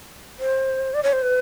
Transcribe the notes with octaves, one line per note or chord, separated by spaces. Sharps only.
C5
D5
C#5
C5
B4